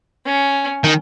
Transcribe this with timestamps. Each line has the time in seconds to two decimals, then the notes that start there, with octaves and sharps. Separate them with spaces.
0.26 C#4
0.84 D#3